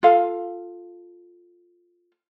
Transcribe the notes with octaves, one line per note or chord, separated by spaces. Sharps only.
F4 A4 F5